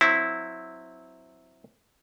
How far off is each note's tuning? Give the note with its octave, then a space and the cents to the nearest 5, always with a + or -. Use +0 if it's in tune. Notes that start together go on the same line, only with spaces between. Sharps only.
F#3 -10 C4 +0 E4 -10